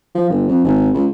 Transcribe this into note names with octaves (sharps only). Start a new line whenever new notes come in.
F3
G1
F2
G#1
C#2